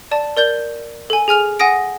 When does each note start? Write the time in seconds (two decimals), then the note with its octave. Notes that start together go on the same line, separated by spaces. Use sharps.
0.11 D5 A5
0.37 A#4 D5 G6 G7
1.10 A4 G#5
1.28 G#4 G#5 F6 F7
1.59 F#5 G#5 D#6 A#6 D7